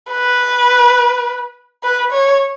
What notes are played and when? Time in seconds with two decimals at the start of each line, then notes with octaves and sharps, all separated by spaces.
0.11 B4
1.84 B4
2.12 C#5